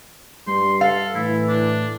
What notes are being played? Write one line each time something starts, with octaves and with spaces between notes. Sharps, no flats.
G2 G3 C6
A4 F5
A2 E3 E4
D4